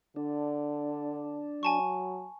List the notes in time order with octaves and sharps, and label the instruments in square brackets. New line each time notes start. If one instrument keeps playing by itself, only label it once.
[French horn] D3 [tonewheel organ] D4
[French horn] F#3 [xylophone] G#5 A5 C#6